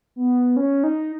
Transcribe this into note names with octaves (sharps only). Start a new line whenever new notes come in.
B3
C#4
D#4